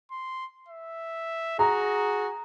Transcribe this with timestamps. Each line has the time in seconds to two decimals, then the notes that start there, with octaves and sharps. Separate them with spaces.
0.11 C6
0.68 E5
1.59 F#4 G#4 A#5